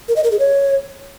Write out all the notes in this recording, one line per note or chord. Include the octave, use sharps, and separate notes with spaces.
A#4
D#5
A#4
G#4
C#5